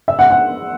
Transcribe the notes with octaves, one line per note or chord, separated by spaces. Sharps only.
E5
F#5
F#5